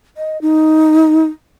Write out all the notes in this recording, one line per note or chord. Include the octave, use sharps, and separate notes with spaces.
D#5
D#4